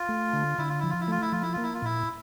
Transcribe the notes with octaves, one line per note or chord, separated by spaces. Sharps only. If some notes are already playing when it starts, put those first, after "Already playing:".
Already playing: F4
A3
D3
D3 E4
F4
F3 E4
F4
E4
A3 F4
E4
F3 F4
E4
A#3 F4
E4
F4
A#2 E4